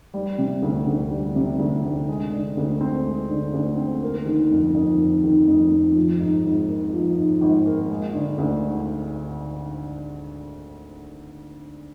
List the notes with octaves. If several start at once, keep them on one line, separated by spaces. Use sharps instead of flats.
G3
C3
D2
D2
G3
C3
D2
D2
G#3
D3
D2
C4
G#3
D3
D2
C4
A#3
D#3
F2
F2
A#3
D#3
F2
F2
F3
G#2
G#1
A#3
F3
G#2
G#1
A#3
G#3
D3
D2